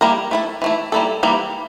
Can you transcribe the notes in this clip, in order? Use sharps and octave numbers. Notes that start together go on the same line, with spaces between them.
G3 A#3 E4 A#4
A3 E4 A4
E3 A3 E4
G3 A#3 E4 A4
E3 G3 A#3 E4